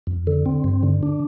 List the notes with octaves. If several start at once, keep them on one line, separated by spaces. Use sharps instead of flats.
F2
D3
C4
G2
D3
D4